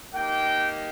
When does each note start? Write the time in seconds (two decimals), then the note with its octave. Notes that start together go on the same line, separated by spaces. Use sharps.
0.15 A#3 D#4 G4 G5